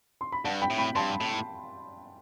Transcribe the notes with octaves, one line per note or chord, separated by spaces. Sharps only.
C6
B5
G2 F#5 A5
G5 B5
A2
G5 B5
G2 A5 C6
A2